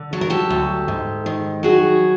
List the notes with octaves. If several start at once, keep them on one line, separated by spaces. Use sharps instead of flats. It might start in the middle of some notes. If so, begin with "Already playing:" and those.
Already playing: D3
F#3 A4
A#4
G4 A4
D2
G#2
D#3
F#3 F#4 G#4